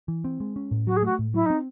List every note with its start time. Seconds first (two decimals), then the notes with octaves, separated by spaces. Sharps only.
0.08 E3
0.24 C4
0.40 G#3
0.56 C#4
0.71 A2
0.87 F#3 F#4
0.96 G#4
1.03 A3 F#4
1.19 A2
1.34 F#3 E4
1.45 C4 D#4